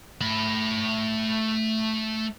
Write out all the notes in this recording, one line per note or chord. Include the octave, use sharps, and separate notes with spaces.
A3 B5